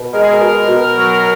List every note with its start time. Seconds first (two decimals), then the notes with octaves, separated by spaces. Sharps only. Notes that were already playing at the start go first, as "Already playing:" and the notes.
Already playing: B2
0.12 G#3 A#4
0.22 G#4
0.31 A#4
0.40 B2
0.68 B2
0.96 F#3